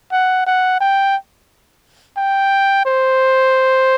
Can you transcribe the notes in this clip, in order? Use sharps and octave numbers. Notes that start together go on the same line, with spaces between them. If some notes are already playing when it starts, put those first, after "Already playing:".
F#5
F#5
G5
G5
C5